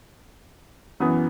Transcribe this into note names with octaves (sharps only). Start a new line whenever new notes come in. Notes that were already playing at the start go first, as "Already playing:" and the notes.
F#2 E3 B3 D#6